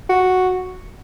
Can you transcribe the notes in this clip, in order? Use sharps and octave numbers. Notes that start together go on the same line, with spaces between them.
F#4